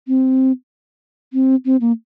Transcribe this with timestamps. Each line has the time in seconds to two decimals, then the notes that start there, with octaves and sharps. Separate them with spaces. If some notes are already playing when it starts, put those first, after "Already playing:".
0.08 C4
1.33 C4
1.65 C4
1.81 A#3